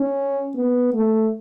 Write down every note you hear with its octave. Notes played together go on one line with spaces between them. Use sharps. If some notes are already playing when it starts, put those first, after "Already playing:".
Already playing: C#4
B3
A3